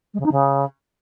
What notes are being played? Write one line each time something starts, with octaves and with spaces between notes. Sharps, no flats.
G#3
C#3
D#4
C#3